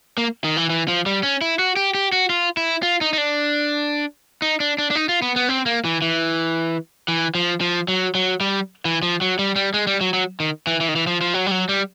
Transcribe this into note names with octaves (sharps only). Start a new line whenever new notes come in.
A#3
D#3
E3
E3
F3
G3
C#4
E4
F#4
G4
G4
F#4
F4
E4
F4
D#4
D#4
D4
D#4
D4
D4
D4
D#4
F4
B3
B3
C4
A#3
E3
E3
E3
F3
F3
F#3
F#3
G3
E3
F3
F#3
G3
G3
G#3
G3
F#3
F#3
D#3
E3
E3
D#3
E3
F3
F3
F#3
G3
F#3
G3